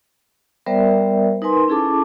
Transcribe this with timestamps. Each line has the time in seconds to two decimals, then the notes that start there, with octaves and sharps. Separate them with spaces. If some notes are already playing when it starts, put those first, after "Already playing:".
0.66 G3 B3 A#4 C5 D5 E5
1.42 D#4 A#4 B4 G#5 C6
1.68 C#4 E4 G#4 A4 A5 D6